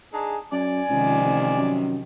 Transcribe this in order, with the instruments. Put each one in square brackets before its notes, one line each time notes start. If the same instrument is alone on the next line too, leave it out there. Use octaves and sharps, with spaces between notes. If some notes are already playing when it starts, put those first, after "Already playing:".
[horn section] D4 D#4 G#4
[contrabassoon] F#2 [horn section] D5 G#5
[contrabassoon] C#2 [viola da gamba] C3 D#3 F3
[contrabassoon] A1
F#2